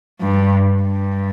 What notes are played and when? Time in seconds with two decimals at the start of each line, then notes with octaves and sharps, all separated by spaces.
0.21 G2
0.83 G2